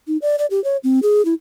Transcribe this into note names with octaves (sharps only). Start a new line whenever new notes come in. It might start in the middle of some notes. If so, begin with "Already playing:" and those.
D#4
D5
D5
G4
C#5
C4
G#4
E4